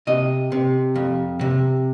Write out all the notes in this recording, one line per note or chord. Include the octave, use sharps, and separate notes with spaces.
C3 D#5
C3
F2
C3